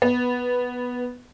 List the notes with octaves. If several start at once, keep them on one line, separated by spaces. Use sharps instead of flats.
B3